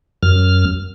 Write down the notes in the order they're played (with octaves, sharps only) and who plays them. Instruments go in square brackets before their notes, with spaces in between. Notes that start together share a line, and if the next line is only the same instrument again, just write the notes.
[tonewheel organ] F#2 F6